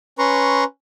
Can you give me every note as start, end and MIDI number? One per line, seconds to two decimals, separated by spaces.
0.19 0.64 61
0.19 0.64 71
0.19 0.64 82
0.19 0.64 84
0.19 0.64 85